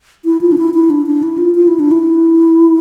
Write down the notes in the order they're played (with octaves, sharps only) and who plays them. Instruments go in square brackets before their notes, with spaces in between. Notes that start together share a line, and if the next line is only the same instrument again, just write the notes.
[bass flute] E4
F4
D4
E4
E4
D4
D4
E4
F4
F4
E4
D4
E4